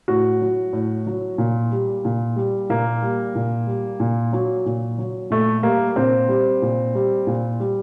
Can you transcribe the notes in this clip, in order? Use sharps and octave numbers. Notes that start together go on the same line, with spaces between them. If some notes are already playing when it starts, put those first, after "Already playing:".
A2 F#4
F#3
A2
F#3
A#2
G3
A#2
G3
A#2 A#3
G3
A#2
G3
A#2
F#3
A#2
F#3
A#2 A3
G3 A#3
A#2 C4
G3
A#2
G3
A#2
G3